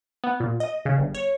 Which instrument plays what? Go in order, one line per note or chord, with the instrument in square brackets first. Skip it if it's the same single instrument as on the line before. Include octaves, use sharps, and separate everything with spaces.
[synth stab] B3
A#2
D#5
C#3
G1
C#5